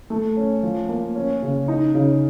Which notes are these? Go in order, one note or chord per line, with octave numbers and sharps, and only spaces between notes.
A3
C#4
F3
A#3
C#4
C#3
D#4
C#3